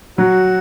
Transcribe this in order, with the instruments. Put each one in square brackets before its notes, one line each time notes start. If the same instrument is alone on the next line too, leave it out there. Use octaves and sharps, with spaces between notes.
[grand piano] F#3 [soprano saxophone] F#4